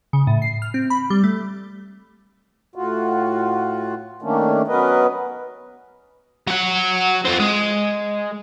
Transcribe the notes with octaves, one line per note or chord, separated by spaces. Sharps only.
C#3
A2
C7
F6
C4
B5
G3
A3
A2 F4 F#4
D#3 A3 A#3 C#4 D4
F#3 B3 C#4 A#4 B4 D#5
F#3 F#5
C4 F4
G#3